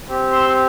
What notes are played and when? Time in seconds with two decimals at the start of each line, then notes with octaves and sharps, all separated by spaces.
0.08 C4 G4
0.32 C6 E6